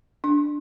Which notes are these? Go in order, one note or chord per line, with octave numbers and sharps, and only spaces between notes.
D4